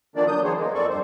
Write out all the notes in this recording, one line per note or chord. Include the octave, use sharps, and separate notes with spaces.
D3 D#3 F3 A#3 D4 D5
F#3 D4 D#6 G6
E3 F#3 B3 G#4 C5 C#5
G#3 A#3
F2 C4 A4 D5 C#6
G2 C5